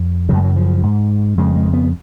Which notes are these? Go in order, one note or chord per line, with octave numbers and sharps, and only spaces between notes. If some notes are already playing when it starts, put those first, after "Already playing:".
Already playing: F2
F#2 C#3 F#3 G#3
F#3
F3
G#2
F2 C#3 G#3
G#3
B3